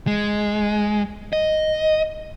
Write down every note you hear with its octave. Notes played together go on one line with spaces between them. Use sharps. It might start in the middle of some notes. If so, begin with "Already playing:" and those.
G#3
D#5